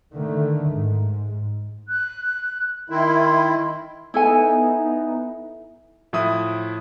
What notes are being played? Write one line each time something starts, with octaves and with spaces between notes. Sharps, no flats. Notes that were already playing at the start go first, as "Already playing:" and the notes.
D3 D#3 A3
G#2
F#6
D#3 E4 C6
B3 D#4 E4 A4 G#5
A2 F3 E4 E5 D#6